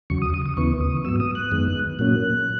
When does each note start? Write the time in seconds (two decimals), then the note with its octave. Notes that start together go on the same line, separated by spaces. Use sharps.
0.10 E2 C#3 F#3 C#6
0.22 D#6
0.34 D#6
0.46 D#6
0.57 D#2 C#3 E3 B3 C#6
0.80 D#6
1.04 G#2 F#3 B3 E6
1.20 D#6
1.35 F#6
1.51 F#2 D#3 G#3 B3
1.99 A#2 F#3 A#3 C#4 F#6